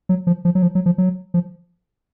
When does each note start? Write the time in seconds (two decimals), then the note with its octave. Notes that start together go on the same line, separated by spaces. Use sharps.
0.09 F#3
0.27 F3
0.45 F3
0.55 F#3
0.62 F3
0.75 F#3
0.86 F3
0.98 F#3
1.34 F3